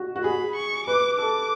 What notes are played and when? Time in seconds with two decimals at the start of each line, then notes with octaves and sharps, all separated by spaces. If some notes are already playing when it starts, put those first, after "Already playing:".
Already playing: F#4
0.16 F#4
0.24 G#4 B5
0.56 C#6
0.87 B4 D6
1.18 A4 D6